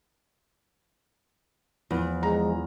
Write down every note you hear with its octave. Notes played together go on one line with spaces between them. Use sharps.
E2 F3
G#3 A#5